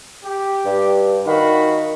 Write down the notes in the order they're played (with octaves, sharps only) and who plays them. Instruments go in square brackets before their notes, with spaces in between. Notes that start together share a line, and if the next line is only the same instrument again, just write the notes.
[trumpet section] G4
[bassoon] G2
[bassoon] D#3 [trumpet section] F#4 F5 B5